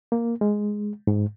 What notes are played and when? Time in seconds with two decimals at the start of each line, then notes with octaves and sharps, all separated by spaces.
0.12 A#3
0.41 G#3
1.07 G#2